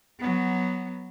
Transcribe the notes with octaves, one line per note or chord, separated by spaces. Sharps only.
F#3 B3